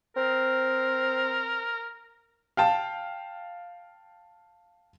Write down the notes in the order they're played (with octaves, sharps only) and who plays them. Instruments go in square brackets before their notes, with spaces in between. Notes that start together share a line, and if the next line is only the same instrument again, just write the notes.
[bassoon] C4 [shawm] A#4
[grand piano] F5 G5 A5